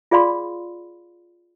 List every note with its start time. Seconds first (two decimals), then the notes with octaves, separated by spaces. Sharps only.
0.11 F4 G#4 D5 F5 B5 C6